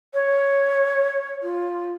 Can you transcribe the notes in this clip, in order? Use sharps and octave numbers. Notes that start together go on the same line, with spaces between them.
C#5
F4